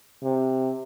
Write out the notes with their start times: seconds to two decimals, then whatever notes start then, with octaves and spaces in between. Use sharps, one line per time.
0.23 C3